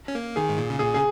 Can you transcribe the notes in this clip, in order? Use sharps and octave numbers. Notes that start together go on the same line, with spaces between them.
C#4
A#3
D#3 G#4
G#2
A#2
C#3
A#2 G#4
C#3 G#4